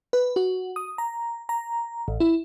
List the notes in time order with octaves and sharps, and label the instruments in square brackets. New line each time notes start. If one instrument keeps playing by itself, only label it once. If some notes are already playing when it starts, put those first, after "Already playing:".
[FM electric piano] B4
F#4
D#6
A#5
A#5
A1
E4